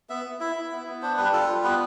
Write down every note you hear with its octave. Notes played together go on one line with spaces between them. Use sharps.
B3 E5
B3
E4 E5
E4
B3
B3
D4 C5
G3 B4
F4 A4
G3
B3 B4